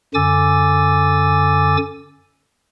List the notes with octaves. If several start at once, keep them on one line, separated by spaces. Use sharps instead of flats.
F#2 D3 G#5 D6 E6 A6